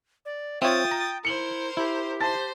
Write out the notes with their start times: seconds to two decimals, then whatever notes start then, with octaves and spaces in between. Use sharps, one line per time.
0.25 D5
0.62 C4 F4 C#5 E5 G5 D#6 A6 E7
0.91 A#5
1.25 E4 A#4 C5 C#7 F#7 G7
1.77 E4 G4
2.21 C5 A5 A6